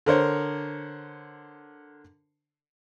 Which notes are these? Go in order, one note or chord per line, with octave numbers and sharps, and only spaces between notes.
D3 A#4 C5 C#5